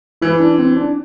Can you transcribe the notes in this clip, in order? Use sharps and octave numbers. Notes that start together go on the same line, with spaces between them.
E3 E4
D4
C4
D4